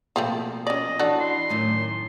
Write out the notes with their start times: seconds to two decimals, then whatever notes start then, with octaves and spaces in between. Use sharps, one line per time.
0.16 B2 F3 A3 A#3 C4 F4
0.67 C#4 D5 D#5
0.99 E3 D4 F#4 A4
1.20 C6
1.49 F#2 A2 D#3